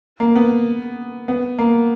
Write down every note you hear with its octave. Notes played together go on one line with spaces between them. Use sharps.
A#3
B3
B3
A#3